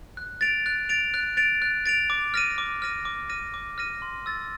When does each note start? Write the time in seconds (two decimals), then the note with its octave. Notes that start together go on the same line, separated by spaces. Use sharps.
0.17 F#6
0.41 A6 D7 F7
0.66 F#6
0.89 A6 D7 F7
1.14 F#6
1.37 A6 D7 F7
1.62 F#6
1.86 A6 D7 F7
2.10 D6
2.34 F6 A#6 D#7
2.58 D6
2.82 F6 A#6 D#7
3.05 D6
3.29 F6 A#6 D#7
3.54 D6
3.78 F6 A#6 D#7
4.02 C6
4.26 E6 A6